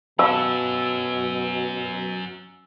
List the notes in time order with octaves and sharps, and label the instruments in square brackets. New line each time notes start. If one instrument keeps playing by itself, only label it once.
[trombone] B2 [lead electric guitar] F#3 C#4 [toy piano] F5 A5 B5 [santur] E6